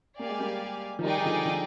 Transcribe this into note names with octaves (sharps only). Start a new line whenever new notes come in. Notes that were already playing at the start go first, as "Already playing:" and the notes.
A#3 G4 D5 F5 G#5
G#3
G3 A#3
F3
D#3 G3 D#4 G#4 D5 G5
D#3
D3 F3
D3 F3